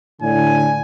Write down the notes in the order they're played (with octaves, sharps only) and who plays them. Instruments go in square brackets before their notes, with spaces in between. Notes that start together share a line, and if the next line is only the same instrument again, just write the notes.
[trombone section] A2 D3 [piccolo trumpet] G#5